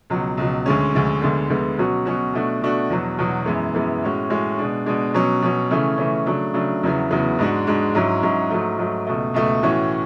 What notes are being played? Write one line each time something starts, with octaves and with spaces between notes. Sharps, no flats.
C#2 B2 F#3
C#2 B2 F#3
D2 D3 G#3 C#4
D2 D3 G#3 C#4
D2 D3 G#3 B3
D2 D3 G#3 B3
B2 F#3 C#4 F#4
B2 F#3 C#4 F#4
B2 A3 D4 F#4
B2 A3 D4 F#4
E2 B2 F#3
E2 B2 F#3
F#2 E3 G#3 B3
F#2 E3 G#3 B3
A2 G#3 C#4 F#4
A2 G#3 C#4 F#4
B2 G#3 D4
B2 G#3 D4
B2 F#3 C#4
B2 F#3 C#4
C#3 E3 A3 C#4
C#3 E3 A3 C#4
C#3 F#3 A3 D4
C#3 F#3 A3 D4
E2 C#3 F#3 B3 E4
E2 C#3 F#3 B3 E4
G#2 G#3 D4 F#4
G#2 G#3 D4 F#4
G#2 F#3 C#4 E4
G#2 F#3 C#4 E4
G#2 F#3 A3
G#2 F#3 A3
C#2 B2 A3
C#2 B2 A3
A2 E3 A3 C#4 F#4